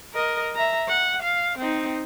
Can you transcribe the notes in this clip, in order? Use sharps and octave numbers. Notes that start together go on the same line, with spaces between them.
A#4 D#5
E5 A#5
F#5
F5
C4 D#4